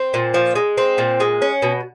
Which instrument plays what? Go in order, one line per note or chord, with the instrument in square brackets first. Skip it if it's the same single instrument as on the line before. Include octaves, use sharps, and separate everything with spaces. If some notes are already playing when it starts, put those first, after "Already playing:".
Already playing: [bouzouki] C4
A#2
F3
G#3
C4
A#2
G#3
C#4
B2